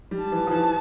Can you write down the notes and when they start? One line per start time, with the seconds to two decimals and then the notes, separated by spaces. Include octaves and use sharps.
0.11 G3
0.22 A5
0.32 E3
0.47 F3
0.51 E3